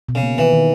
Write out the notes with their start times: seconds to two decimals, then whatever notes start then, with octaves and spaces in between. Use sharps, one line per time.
0.09 B2
0.15 C#3
0.23 A#3
0.38 D#3 E3
0.53 D#3